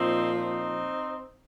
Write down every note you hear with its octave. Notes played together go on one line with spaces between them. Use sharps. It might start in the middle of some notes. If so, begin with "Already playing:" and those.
Already playing: A#2 F3 C4 D#4
C4 D#4